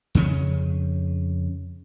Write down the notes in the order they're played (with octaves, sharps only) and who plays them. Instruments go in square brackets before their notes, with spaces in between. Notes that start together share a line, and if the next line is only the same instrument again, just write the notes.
[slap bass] F2 C#3 C#4